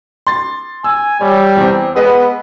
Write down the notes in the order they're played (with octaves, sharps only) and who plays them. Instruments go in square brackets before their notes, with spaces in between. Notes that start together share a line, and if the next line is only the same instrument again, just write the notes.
[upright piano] C6 A6
[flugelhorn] G#5 [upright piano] E6
[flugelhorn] G3 [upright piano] C#5
[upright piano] E2 C4
[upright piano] G#3 B4 D#5 [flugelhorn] B3